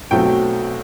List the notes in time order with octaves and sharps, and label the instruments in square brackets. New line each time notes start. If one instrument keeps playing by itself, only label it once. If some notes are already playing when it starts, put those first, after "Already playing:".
[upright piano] B1 B2 F#3 A3 C4 G5